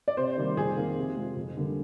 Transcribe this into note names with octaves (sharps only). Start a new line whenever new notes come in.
D5
C3 C5
D#3 G3 A#3
F2 G#4
D#3 A#3
C3
F3 G#3
F2
D3 G3 A#3